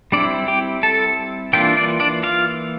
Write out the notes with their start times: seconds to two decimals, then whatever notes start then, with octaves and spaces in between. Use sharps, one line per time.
0.12 G3 C4 D4 E4 D5
0.48 G4 G5
0.83 A4 A5
1.53 E3 A#3 D4 F4 G4 G5
1.77 D4 D5
2.00 D4 D5
2.23 F4 F5